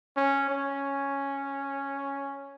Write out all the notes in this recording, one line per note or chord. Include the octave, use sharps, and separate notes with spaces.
C#4
C#4